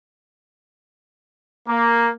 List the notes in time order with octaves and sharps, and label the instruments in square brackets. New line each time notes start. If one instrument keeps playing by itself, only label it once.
[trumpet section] A#3